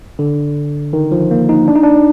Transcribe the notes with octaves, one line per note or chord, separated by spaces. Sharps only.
D3
D#3
F3
A#3
D#4
D4
D#4
D4